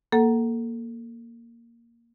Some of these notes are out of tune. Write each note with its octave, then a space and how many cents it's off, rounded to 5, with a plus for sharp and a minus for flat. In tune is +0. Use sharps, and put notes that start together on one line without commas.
A#3 +0 A4 +0 F#5 +10